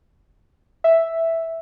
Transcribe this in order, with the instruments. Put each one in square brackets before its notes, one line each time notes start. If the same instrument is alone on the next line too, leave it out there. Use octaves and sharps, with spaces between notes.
[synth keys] E5